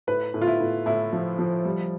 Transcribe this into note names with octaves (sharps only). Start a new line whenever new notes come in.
A2 B4
A2
F4
E4
A2
A2 E4
F3
F3
G3